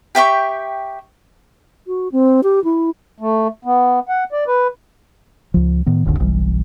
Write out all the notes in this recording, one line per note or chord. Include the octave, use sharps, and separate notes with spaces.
G4 E5 G5 C#6
F#4
C4
G4
E4
A3
B3
F#5
D5
B4
C#2 F3
A2 D#3 B3
D#1 G#1 D#2 D3
F#1 B1 E3 G3